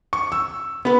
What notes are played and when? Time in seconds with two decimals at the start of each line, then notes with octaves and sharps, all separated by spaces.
0.13 C#6
0.32 E6
0.85 B3 B4